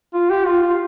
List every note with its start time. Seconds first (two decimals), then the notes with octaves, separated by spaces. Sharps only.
0.14 F4
0.30 G4
0.46 F4
0.62 F4